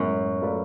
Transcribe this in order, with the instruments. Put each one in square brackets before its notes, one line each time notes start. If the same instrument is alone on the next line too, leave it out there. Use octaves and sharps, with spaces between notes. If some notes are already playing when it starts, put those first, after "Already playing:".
Already playing: [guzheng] F#2 [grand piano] A2 G#3 B3
[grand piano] F#3 A3 F4 B4 D5